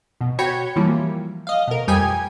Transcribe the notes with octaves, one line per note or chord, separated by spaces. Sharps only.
B2
F#4 C#5 G5 B5 G#6 C#7
E3 F3 G3 A#3
D#5 F5
B2 A#4
F2 G3 G5 G#5 D#6 G#6